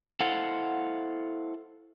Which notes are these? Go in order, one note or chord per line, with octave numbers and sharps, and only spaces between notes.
E4 A4 C5 F5 F#5